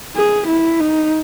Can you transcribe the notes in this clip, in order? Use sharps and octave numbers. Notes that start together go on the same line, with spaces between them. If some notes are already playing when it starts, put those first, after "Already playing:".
G#4
E4
D#4